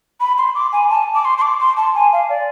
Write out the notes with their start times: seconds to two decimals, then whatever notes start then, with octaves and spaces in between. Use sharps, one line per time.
0.20 B5
0.38 C6
0.55 D6
0.73 G#5
0.90 A5
1.15 D6
1.25 C6
1.38 C6
1.42 D6
1.60 C6
1.77 A5
1.95 G#5
2.13 F5
2.29 D5